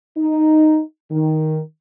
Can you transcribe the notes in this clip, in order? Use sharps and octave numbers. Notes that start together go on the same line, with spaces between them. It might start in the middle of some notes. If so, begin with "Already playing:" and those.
D#4
D#3